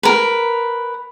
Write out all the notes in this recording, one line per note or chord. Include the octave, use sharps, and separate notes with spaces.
A#4 B4